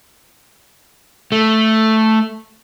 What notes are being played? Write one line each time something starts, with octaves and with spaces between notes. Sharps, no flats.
A3